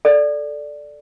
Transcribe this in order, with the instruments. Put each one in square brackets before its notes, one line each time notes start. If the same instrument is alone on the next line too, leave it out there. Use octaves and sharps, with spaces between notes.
[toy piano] A4 D5